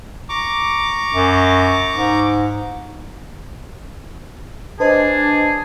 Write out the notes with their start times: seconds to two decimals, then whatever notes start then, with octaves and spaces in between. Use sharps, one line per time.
0.29 A#5 C#6 D6
1.14 F#2
1.93 G#2
4.80 D4 G#4 B4 C5 D#5 A5